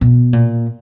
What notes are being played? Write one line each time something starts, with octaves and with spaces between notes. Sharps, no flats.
B2
A#2